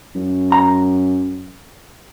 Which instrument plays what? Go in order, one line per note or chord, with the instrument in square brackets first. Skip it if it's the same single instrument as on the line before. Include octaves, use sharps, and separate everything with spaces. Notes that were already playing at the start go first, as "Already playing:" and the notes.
[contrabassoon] F#2
[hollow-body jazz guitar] A#5